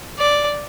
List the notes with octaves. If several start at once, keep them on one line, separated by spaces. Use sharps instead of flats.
D5